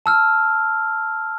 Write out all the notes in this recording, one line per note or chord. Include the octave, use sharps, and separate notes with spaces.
A5 E6 F6